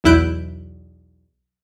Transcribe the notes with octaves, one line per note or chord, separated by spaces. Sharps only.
B1 E2 E4 F#6 G6 D7